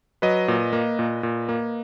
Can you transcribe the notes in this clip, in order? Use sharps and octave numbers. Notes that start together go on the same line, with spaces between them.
F#3 B4 D#5
A#2
A#3
A#2
A#2
A#3